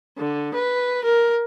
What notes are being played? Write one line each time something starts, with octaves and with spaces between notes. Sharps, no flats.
D3
B4
A#4